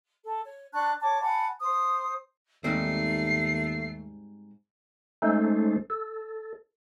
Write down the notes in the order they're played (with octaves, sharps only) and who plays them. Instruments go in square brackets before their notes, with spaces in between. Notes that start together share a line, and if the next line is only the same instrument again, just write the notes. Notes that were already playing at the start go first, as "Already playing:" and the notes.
[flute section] A4
C#5
D4 A5 C#6 F#6
C#5 A5 D6
F#5 G#5 A5 B5
C5 D#6
[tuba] D#2 [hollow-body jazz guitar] G#2 G3 C4 [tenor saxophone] A3 [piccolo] C7
[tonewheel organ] G#3 A3 C#4 D#4 A4 C5
A4